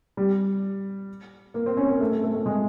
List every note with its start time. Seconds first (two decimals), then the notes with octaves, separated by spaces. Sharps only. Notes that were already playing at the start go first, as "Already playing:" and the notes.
0.17 G3
1.54 A#3
1.66 C4
1.77 C#4
1.88 A#3
2.00 A3
2.12 A3
2.24 A3
2.35 A3
2.46 G#3